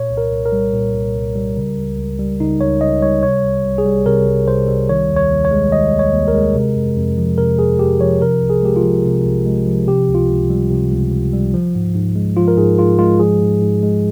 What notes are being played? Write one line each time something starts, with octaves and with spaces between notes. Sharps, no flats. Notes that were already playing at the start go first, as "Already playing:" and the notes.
Already playing: A#2 C#5
C2
A#4
C2
A#4
G3
A#2
C2
C2
G3
C#3
C#2
C#2
G3
C#3 D#4
C#2 C#5
C#2 D#5
G3 C#5
C3 C#5
C2
C2
G#4
G3
C3 A#4
C2
C2 C5
G3
D#3 C#5
D#2
C#5
D#2
C#5
G#3
D#3 D#5
D#2
C#5
D#2
A#4
G#3
C3
F2
F2
F3
C3 A#4
F2 G#4
F2 G4
F3 C#5
C3 A#4
C2
G#4
G#3 G4
F4
F3
C3
C2
G#3
F3
C3 G4
C#2
F4
C#2
G3
C3
C#2
C#2
G3
F3
G#2
G#2
G#3
F3 F4
A#4
G#2 G#4
G#2 F4
G#3 F4
F3 G#4
G#2
G#2
G#3